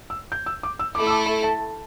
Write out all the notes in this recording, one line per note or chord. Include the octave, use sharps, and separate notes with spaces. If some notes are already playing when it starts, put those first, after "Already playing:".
E6
G6
E6
D6
E6
A3 E4 A4 D6
E6
D6
B5
A5